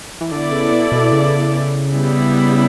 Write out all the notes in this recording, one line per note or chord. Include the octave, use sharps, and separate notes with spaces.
E3
D3 B3 E4 A4 D5
C#3
B2
B2
C#3
G3 B3 E4